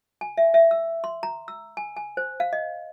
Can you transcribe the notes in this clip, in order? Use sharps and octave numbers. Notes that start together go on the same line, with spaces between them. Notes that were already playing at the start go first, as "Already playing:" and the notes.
G#5
E5
E5
E6
C6
A#5
E6
G#5
G#5
C5
F5
D#5